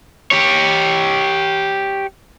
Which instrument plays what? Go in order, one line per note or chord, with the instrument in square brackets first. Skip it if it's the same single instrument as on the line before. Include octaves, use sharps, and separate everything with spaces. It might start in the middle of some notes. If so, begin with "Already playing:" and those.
[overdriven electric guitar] G4 C#5